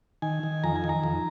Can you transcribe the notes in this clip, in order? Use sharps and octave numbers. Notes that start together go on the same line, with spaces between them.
D#3 G#5
D#3
F2 A#5
G#5
D#3
A#5
F2